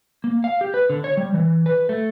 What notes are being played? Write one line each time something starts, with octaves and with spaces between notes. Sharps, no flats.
A#3
F5
G4
B4
D3
C#5
G3
E3
B4
A3